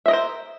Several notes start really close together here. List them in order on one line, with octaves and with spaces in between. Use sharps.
E5 D#5 A#4 C5